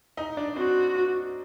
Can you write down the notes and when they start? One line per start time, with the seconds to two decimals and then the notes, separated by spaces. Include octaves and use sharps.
0.17 D#4 D#5
0.37 D4 D5
0.56 C4 F#4 C5